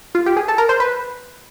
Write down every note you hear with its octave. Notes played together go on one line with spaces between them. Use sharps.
F4
G4
G#4
A4
A#4
C5
B4